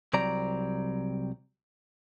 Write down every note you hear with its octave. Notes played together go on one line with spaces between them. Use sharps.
C2 F#3 C4 D5 A#5